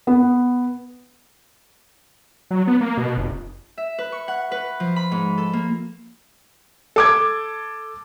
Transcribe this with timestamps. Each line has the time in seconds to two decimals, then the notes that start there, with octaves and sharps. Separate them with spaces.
0.07 B3
2.51 F#3
2.67 B3
2.81 A#3
2.98 B2
3.18 F1
3.78 E5
3.99 B4
4.12 C#6
4.28 F#5
4.52 B4
4.80 F3
4.96 B5
5.12 G#2
5.38 A4
5.53 A#3
6.96 A4 D6 G#6